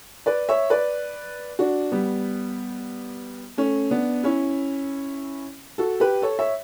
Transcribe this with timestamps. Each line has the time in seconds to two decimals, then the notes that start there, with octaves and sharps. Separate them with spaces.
0.26 B4 D5
0.49 C#5 E5
0.70 B4 D5
1.59 D4 F#4
1.92 G3 B3
3.57 A3 C#4
3.90 B3 D4
4.23 C#4 E4
5.78 F#4 A4
6.00 G4 B4
6.22 A4 C#5
6.39 C#5 E5